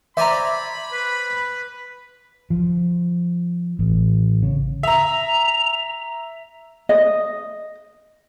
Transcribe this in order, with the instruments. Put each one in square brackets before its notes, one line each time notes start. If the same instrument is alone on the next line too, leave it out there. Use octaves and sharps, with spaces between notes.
[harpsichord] C5 D5 G#5 [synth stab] E5 A#5 [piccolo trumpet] B5
[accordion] B4
[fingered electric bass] F3
A1
C#3
[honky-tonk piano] E5 A#5 [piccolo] F7
[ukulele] D#5